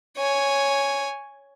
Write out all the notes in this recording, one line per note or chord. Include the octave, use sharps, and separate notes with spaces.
C#5 G#5